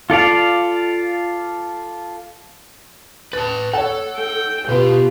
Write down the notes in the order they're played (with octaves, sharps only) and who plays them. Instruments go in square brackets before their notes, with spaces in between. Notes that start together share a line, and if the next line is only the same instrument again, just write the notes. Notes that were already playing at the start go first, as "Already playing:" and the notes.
[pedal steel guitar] F4 A4 D5 F5
[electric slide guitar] B4 A5 [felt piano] A6
[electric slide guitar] A4 [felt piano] C#5 F#5
[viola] G5
[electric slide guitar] B2 B3 [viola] F4 G4 [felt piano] B4